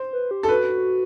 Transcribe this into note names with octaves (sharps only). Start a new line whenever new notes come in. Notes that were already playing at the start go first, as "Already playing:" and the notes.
Already playing: C5
B4
G4
A4
F#4 B4